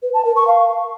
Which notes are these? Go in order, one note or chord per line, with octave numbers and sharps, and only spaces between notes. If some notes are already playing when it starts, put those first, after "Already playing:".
B4
A5
A#4
C#6
F5